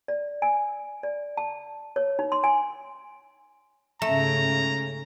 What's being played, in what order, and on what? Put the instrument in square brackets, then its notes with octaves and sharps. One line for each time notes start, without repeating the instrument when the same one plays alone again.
[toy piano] D5
G#5
D5
A5
C#5
D#4
C6
G#5
[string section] G#2 C#3 [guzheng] A3 [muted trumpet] A#5